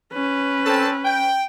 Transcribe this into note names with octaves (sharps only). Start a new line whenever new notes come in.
C#4 B4
C4 A4 A5
G5